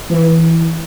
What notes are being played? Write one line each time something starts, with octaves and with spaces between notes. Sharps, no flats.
E3